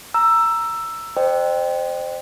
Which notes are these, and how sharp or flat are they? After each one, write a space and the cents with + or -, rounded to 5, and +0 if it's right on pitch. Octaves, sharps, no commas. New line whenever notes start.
A#5 +0 E6 +10
C5 -5 D#5 -45 G5 +0